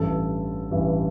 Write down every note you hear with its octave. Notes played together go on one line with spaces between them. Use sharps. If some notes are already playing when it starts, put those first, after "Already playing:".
Already playing: A1 G2 E3 A4
A1 G2 E3